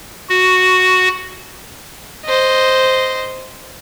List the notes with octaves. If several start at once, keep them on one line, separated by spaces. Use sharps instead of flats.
F#4
C5 D#5